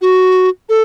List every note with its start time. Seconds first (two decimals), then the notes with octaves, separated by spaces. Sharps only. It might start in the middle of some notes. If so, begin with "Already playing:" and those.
0.01 F#4
0.69 A4